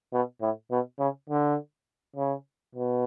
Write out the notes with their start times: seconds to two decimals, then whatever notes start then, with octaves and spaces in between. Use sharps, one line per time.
0.13 B2
0.41 A2
0.71 B2
0.99 C#3
1.29 D3
2.16 C#3
2.75 B2